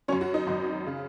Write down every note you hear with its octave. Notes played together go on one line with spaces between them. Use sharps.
F#2 F#3 C#4 C#5
F#4
D#4
G#1 F#2 F#3
C#3